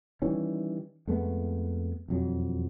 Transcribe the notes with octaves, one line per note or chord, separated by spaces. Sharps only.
D#3 E3 G3 C#4
F2 G#3 A3 B3
E1 F2 F#3